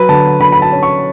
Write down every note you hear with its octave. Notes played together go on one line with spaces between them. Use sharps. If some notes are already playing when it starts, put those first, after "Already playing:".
Already playing: F#3 B4
D3 A5
D3 B5
B5
A5
C#4
C#6